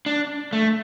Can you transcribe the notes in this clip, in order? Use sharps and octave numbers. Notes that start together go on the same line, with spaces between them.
D4
A3